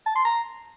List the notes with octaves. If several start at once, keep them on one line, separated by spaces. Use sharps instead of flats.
A5
C6
A#5